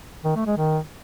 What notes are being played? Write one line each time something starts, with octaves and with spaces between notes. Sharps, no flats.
D#3
A3
G#3
D#3